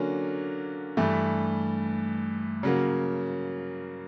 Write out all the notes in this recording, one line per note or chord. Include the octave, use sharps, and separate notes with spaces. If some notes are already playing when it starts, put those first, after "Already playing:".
Already playing: D3 F#3 A#3 C#4
G2 E3 A3
C#3 F#3 A#3